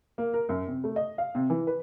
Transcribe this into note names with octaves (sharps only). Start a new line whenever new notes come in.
A#3
A#4
F#2
C3
A3
D#5
F5
C3
E3
B4